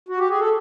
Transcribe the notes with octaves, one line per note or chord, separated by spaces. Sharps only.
F#4
G4
G#4
A4